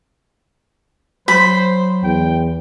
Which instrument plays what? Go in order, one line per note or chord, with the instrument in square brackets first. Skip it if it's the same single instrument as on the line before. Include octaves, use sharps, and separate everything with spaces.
[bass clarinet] F#3 [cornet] C5 [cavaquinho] B5
[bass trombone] E2 [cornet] G5